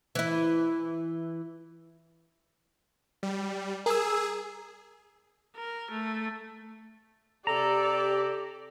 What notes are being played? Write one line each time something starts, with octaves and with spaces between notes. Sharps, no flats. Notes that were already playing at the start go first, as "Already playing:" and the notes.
E3 E4
G3
G#4 A#4 E6
A#4
A3
C3 G4 A4 D5 A#5